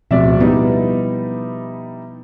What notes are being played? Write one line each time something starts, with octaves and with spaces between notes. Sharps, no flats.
D1 B2 F3 C4 D5 E5
G3 B3 D#4 E4